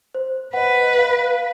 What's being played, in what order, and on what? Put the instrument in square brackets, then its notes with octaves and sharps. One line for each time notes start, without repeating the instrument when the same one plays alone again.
[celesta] C5
[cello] B4 [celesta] D#5 F#5
[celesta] F5